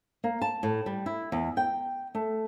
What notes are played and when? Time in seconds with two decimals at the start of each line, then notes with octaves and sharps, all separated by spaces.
0.24 A#3
0.42 A5
0.63 A2
0.86 G3
1.06 E4
1.32 E2
1.57 G5
2.15 A3